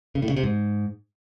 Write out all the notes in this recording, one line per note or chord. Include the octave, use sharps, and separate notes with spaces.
C#3
A2
C#3
C3
G#2